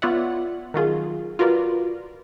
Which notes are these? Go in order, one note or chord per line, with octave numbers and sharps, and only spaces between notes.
B3 F4 C#5 D5 E5 F#5
D#3 F#3 F4 G#4
F4 F#4 A#4 B4 D5